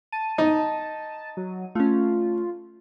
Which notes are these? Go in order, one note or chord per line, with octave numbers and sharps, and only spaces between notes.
A5 D#7
D#4
F#3
A3 C#4 F4